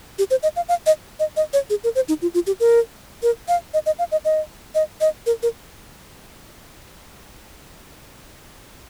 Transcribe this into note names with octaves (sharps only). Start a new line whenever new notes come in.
G4
C5
D#5
F5
F5
D#5
D#5
D#5
C#5
G#4
A#4
C5
D#4
F4
F4
G4
A#4
A#4
F5
D#5
D#5
F5
D#5
D#5
D#5
D#5
A#4
A#4